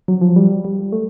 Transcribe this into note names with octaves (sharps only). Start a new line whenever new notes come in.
F#3
F3
G3
G3
A3